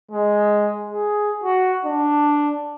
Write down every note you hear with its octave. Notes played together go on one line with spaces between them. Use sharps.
G#3
G#4
F#4
D4